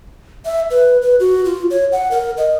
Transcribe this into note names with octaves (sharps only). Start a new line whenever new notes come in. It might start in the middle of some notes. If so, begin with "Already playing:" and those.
E5
B4
B4
F#4
F4
C#5
F#5
A#4
D#5